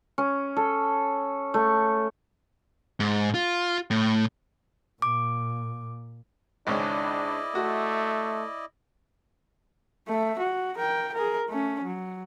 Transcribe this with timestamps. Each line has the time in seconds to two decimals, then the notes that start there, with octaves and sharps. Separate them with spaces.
0.18 C#4
0.56 A4
1.54 A3
3.00 G#2
3.34 F4
3.91 A2
5.02 A#2 D6
6.67 G#1 C#2 C#4 D4 E4 D5 D#5
7.55 A3 F#4
10.08 A3 E5
10.39 F#4
10.78 A#4 G5
11.14 G#4 A#4
11.48 A3 C#4
11.84 F#3